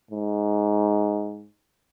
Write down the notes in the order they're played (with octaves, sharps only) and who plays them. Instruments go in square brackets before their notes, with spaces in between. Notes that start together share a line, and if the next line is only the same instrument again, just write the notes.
[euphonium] G#2